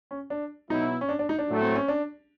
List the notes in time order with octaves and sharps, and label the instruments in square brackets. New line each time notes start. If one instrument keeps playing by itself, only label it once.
[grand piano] C#4
D4
[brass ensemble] B2 F#3 B3 E4 [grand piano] D#4
[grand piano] C#4
D4
D4
D#4
D4
[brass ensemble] A2 F#3 A3
[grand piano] C4
C#4
D4